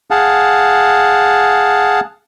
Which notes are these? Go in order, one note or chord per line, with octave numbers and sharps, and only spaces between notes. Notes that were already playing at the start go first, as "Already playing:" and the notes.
G#4 F5 F#5 A5